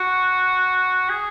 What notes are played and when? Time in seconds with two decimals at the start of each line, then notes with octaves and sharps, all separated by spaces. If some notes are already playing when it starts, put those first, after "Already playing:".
Already playing: F#4
1.10 G#4